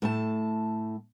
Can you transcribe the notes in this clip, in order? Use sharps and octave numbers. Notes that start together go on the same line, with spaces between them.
A2 A3 A5